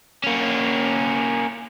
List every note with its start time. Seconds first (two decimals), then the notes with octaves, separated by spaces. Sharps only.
0.24 A#3 C#4